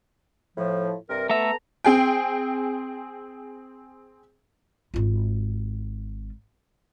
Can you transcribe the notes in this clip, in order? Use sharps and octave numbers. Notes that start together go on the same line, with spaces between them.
A2 F3
G2 C3 A#4
A3 B3 A4 E5 A#5
C4 G#4 G5
G#1 F4